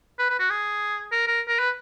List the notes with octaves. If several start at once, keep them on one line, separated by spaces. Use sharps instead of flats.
B4
B4
F#4
G#4
A#4
A#4
A#4
B4